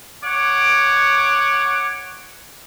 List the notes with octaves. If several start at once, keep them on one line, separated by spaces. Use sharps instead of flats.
C#5 F#5 D6